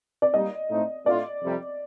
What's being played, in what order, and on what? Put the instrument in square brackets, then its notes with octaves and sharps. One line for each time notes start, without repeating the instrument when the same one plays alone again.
[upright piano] D5
[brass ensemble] G3 A#3 D#4 [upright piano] D#5
[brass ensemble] A2 A3 C4 D#4
[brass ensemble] A2 A3 D4 F4 [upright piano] D5
[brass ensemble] F2 C3 G3